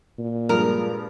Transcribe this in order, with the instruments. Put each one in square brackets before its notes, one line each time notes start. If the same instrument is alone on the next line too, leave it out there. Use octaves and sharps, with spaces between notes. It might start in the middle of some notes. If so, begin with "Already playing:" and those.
[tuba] A#2
[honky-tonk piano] G2 F3 G#3 [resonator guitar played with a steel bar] A#4